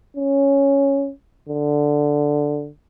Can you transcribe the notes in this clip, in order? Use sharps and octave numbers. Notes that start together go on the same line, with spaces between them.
C#4
D3